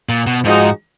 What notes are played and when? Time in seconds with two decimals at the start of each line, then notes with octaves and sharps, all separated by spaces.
0.09 A#2
0.27 B2
0.44 G#2 F3 G#3 D#4 F#4